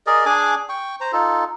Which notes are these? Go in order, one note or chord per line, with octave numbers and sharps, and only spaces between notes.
G#4 A#4 D5 D#5
D4 G#4 G#5 D6
G5 C#6
C5 A#5
D#4 F4 A4